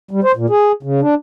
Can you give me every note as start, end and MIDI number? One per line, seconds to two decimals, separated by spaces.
0.11 0.20 55
0.24 0.32 72
0.36 0.46 46
0.50 0.72 68
0.83 1.00 49
1.01 1.15 62